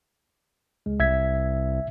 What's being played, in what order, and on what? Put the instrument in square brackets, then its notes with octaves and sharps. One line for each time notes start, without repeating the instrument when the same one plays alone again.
[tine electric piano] C#2 G#3
[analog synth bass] C2 [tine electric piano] E5 G#6 B6